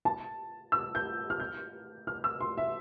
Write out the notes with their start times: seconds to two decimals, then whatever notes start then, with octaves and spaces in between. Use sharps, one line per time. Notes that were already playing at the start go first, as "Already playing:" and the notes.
0.05 A5
0.72 E6
0.95 G6
1.30 F6
1.40 G6
2.07 F6
2.24 E6
2.41 C6
2.58 E5